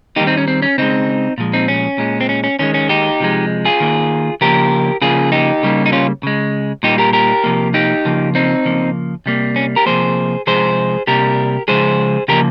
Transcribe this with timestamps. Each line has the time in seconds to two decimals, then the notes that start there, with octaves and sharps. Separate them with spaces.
0.16 D#3 G3 A#3 D#4 G4
0.27 C4 D#4
0.37 C#4
0.48 C4
0.62 C#4
0.78 C#3 G#3 C4 D#4
1.38 A#2 F3 G#3
1.53 C4 D#4
1.68 C#4
1.98 A#2 G#3
2.21 C4
2.29 C#4
2.44 C#4
2.59 D#3 G#3 C#4
2.74 C#4
2.89 D#4 G4
3.20 C3 F3 G#3
3.65 F4 G#4
3.80 D#3 A#3
4.41 C#3 F3 A#3 G4 A#4
5.02 C#3 F3 A#3 F4 G#4
5.32 D#4 G4
5.63 C#3 G3 A#3
5.86 D#4
5.92 C#4 F4
6.23 C#3 G#3
6.83 A#2 G3 A#3 D#4 G4
6.98 G4 A#4
7.13 G4 A#4
7.44 C3 F3 A#3
7.74 D#4 G4
8.05 C#3 F3 A#3
8.35 C4 D#4
8.65 C#3 F3 A#3
9.26 C3 G3 A#3
9.56 C#4
9.76 G4 A#4
9.86 C3 F3 A#3 G#4 C5
10.47 C3 F3 G#3 G#4 C5
11.07 C3 G3 A#3 G4 A#4
11.68 C#3 F3 G#3 G#4 C5
12.28 C#3 F3 A#3 G4 A#4